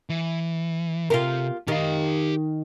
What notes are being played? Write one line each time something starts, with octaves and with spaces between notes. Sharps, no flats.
E3
C3 F4 G4 A#4
D#3 G4 F5